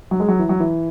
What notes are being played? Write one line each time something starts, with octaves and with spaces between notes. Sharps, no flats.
F#3
G#3
F#3
E3
F#3
E3